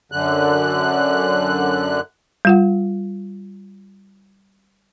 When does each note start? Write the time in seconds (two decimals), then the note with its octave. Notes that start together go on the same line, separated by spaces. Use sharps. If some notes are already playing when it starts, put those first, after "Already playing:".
0.12 F#2 D3 F#6
2.45 G3 F4 F#5